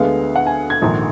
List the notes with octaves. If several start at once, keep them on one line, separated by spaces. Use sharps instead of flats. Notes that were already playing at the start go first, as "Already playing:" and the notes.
Already playing: D2 D3 G#3 B3 F5
F#5
G#5
G#6
A#1 G#2 D#3